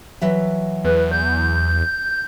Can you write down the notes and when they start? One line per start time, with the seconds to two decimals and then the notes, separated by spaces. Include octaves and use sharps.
0.22 E3 F#3 E5
0.84 E2 B4
1.11 G6